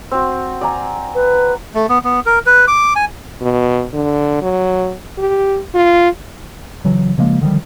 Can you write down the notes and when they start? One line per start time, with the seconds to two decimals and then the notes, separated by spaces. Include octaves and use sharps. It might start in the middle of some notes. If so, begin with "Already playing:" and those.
0.11 C4 F#4
0.61 D5 G#5 A#5
1.15 B4
1.74 A3
1.89 B3
2.05 B3
2.26 A#4
2.46 B4
2.68 D6
2.96 G#5
3.42 B2
3.93 D3
4.42 F#3
5.18 G4
5.74 F4
6.84 C#3 E3 F#3
7.18 C#3 F3 G#3 A#3
7.41 D3 D#3 F3 G3